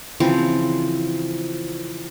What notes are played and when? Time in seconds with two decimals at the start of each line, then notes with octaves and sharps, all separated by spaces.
0.20 C#3 E3 F3 C4